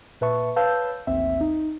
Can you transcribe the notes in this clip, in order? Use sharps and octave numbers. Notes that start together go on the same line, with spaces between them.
A#2 B4 E5 A5 C#6
B4 C#5 F5 A5 E6 G6
A1 D#2 C4 E5
D#4